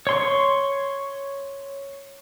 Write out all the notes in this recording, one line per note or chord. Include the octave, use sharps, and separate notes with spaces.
C#5 C6 C#6